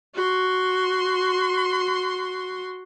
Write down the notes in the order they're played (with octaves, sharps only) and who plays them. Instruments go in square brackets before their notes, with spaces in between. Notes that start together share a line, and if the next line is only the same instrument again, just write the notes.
[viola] F#4 C6